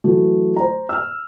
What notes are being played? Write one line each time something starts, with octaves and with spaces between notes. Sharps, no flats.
E3 F#3 A3
C5 A#5
E6 F6